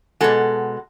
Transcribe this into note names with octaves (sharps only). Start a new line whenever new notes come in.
B2 G#3 F#4 A4